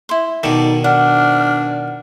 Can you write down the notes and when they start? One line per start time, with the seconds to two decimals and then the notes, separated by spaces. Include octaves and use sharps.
0.09 E4 C6
0.43 B2 D#3 D#4 A4 D5
0.84 D4 F#5 F6